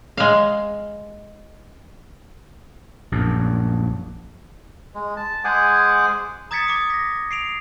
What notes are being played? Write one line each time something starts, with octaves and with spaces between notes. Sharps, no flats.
G#3 F5
A#1 F#2
G#3
A5
G#3 G#4 C5 F#5 G#5 D6
A#5 D#6 G#6 A6 B6 C#7
D6 D#6
A#6 B6
C7 D7 F7